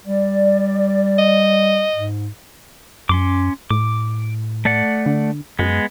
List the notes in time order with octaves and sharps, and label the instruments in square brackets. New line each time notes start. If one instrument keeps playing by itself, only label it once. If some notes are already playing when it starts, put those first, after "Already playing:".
[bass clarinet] G3 [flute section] D5
[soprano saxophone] D#5
[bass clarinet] G#2
[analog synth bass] F#2 [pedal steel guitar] C#4 C6 D6
[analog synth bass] A2 [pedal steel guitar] D6
[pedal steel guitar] A3 D5 F#5
[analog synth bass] D3
[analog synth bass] F#2 [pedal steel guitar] G#3 B3